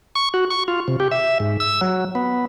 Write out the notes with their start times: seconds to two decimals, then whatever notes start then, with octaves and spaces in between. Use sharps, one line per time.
0.15 C#6
0.34 F#4
0.50 C#6
0.68 F4
0.88 C3
1.00 G4
1.12 E5
1.40 G#2
1.60 E6
1.81 F#3
2.15 B3